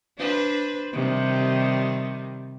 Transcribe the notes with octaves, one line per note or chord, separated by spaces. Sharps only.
D4 B4 C5
C3 D#3 G3